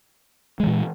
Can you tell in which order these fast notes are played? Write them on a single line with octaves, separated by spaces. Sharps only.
G#3 E3 A#2